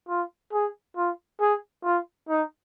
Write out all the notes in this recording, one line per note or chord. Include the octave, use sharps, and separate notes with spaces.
F4
G#4
F4
G#4
F4
D#4